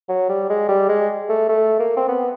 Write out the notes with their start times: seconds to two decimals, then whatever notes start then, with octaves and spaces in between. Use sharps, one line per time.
0.09 F#3
0.29 G3
0.50 G#3
0.68 G3
0.89 G#3
1.29 A3
1.49 A3
1.79 A#3
1.97 C4
2.08 B3